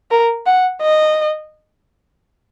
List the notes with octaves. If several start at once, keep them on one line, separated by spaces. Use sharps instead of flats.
A#4
F#5
D#5